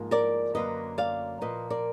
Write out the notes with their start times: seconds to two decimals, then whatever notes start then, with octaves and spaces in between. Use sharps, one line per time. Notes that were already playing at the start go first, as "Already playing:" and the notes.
Already playing: G#2 F3 A#3
0.11 A#4 D5
0.55 F#2 D3 F#3 A#3 B4 D#5
0.98 D5 F5
1.41 A#2 F3 A#3 B4 D#5
1.70 A#4 D5